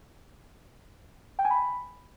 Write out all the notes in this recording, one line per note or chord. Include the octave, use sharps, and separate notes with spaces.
G5
G#5
B5